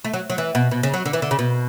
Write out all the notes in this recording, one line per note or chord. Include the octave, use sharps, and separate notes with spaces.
A3
F#3
F#3
E3
B2
B2
C#3
F#3
D3
E3
D3
C#3
B2